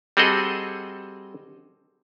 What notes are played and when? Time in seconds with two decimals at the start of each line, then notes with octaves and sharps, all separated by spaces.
0.17 G3 C4 F#4 G#4 A4 D#5